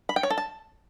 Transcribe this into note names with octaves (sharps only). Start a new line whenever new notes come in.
B5
G5
C#5
A4
A5